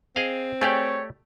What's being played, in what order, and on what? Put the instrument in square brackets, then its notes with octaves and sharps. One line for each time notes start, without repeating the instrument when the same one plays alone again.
[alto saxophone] C4 [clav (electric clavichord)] G#4 D#5 F5
[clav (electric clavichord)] A3 G4 D5 [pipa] G#4 F5 G5 [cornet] C#5